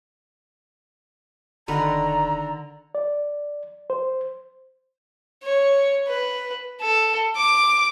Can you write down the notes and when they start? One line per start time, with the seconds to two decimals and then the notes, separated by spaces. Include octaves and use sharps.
1.68 E1 D3 D#3 B4 A#5
2.95 D5
3.90 C5
5.43 C#5
6.08 B4
6.81 A4
7.36 D6